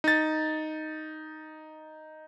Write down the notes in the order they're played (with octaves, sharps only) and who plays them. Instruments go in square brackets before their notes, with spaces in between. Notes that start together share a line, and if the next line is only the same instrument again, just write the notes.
[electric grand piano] D#4 A6